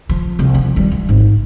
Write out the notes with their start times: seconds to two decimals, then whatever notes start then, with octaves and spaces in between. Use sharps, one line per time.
0.09 F3
0.39 C2
0.54 F3
0.76 D#3 G3
0.92 E3
1.09 A1 G#2